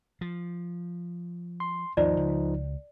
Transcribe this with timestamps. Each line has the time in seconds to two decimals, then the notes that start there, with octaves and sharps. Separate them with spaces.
0.21 F3
1.60 C6
1.97 D#2 G#2 F3 D#4 D5
2.17 C#2